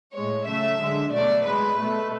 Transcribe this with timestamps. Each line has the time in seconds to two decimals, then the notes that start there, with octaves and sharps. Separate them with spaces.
0.15 A2 G#3 C#5
0.47 C#3 F#3 A3 E5
0.80 D3 G#3
1.13 B2 F#3 A3 D5
1.45 A2 G#3 B4
1.78 B2 A3